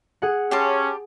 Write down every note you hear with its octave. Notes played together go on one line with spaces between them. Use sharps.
G#4 F#5
C#4 G4 A5 C6